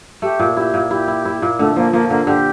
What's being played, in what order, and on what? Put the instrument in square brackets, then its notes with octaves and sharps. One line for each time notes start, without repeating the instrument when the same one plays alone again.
[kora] A3 [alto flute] G4
[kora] A#2
[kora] E4 [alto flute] G4
[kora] A#2
[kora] E4 [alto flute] G4
[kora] E4
E4
A#2
[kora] D3 [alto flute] A3
[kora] F3 [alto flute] A#3
[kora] F3 [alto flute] A#3
[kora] D3 [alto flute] A#3
[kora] D3 [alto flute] G4